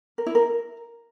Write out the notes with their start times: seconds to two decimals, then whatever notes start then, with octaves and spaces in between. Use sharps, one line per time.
0.18 A#4
0.26 E4
0.35 A#4